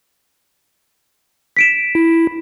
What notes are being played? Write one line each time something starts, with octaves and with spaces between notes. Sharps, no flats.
B6 D7 E7
E4